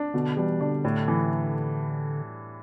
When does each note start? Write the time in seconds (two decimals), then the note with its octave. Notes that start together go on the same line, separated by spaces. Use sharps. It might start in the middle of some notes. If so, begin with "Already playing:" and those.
Already playing: D4
0.14 B2 D3
0.37 E3 G3
0.61 D3 D4
0.84 A2
1.08 E3